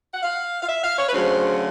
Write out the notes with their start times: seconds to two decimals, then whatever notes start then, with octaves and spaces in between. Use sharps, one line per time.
0.13 F#5
0.23 F5
0.63 F5
0.68 E5
0.83 F5
0.99 C#5
1.08 B4
1.13 D2 C#3 F#3 C5